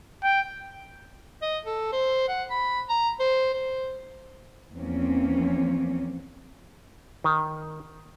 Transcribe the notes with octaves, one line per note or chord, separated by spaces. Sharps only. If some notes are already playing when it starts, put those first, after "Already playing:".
G5
D#5
A4
C5
F#5
B5
A#5
C5
C5
E2 F3 A#3 C4 C#4
D#3